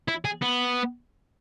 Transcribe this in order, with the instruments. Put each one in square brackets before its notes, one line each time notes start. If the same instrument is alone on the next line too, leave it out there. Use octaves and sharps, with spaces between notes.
[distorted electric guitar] E4
G#4
B3